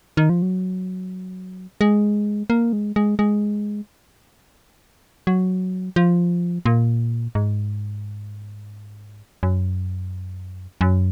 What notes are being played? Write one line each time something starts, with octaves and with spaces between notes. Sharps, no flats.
D#3
F3
F#3
G#3
A#3
G#3
G#3
G#3
F#3
F3
A#2
G#2
F#2
F#2